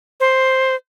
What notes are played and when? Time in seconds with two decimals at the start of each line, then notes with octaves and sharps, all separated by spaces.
0.20 C5